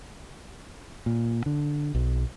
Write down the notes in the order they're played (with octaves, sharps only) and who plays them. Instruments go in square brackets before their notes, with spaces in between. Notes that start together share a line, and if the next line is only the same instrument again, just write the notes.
[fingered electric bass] A#2
D3
B1